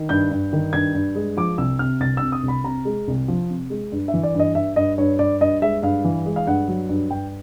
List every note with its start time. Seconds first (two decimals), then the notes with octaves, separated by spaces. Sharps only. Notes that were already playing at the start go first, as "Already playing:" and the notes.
Already playing: D#3
0.09 G2 G6
0.31 G2
0.53 D#3
0.73 G2 G#6
0.95 G2
1.15 G#3
1.37 F3 D6
1.58 C2 E6
1.79 C3 F6
2.00 C2 A6
2.17 E6
2.23 C3
2.32 D#6
2.43 C2
2.48 B5
2.64 C3 A#5
2.85 G#3
3.08 C2
3.28 F3
3.50 C3
3.70 G#3
3.92 G2
4.08 E5
4.14 E3
4.23 D5
4.35 G2 D#5
4.55 G2 E5
4.76 G2 D#5
4.98 G2 C#5
5.19 G2 D5
5.41 G2 D#5
5.62 G#3 E5
5.83 G2 F5
6.04 E3
6.26 G#3
6.36 F5
6.47 G2 F#5
6.68 F#3
6.89 G2
7.11 G2 G5